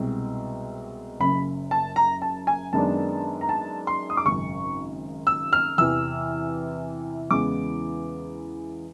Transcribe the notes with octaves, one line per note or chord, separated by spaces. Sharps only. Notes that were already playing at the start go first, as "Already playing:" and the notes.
Already playing: C2 B2 G#3 C4
F#1 F#2 C#3 B5
A5
A#5
A5
G#5
F#2 D#3 G#3 B3 D4 A5
A#5
A5
C6
D#6
D6
G#1 F#2 C#3 C#6
E6
F6
E2 C3 E3 E6
E2 C#3 E3 G#3 B3 D6